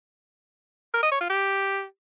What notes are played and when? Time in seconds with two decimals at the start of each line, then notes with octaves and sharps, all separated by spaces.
0.94 A#4
1.03 D#5
1.12 C#5
1.21 F4
1.30 G4